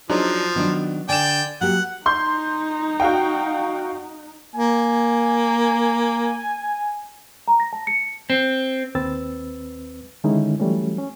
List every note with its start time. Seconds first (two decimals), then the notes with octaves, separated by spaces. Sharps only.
0.10 F3 F#3 D4 D#4 G#4 C5
0.56 D#3 F#3 B3 D4
1.09 D3 D5 G5 G#5 E7
1.61 F#3 A#3 G4 F#5
2.06 D#4 C6 G6
3.00 F#4 F5 G5
4.55 A#3 G#5
7.48 A#5
7.60 A#6
7.73 A5
7.87 C#7
8.30 C4
8.95 D#2 C4 B4 E6 A6
10.24 D3 D#3 G#3 C#4 D#4 E4
10.60 E3 F#3 G3 A3 C#4
10.98 C#4